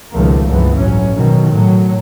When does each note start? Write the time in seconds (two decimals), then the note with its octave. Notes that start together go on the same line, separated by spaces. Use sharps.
0.12 C#2 B2 D#3 F3 A3 A#3
0.49 C#2 G2 E3 F3 B3
0.77 A1 F#3 C#4
1.14 B2 D#3 F#3
1.52 A2 F#3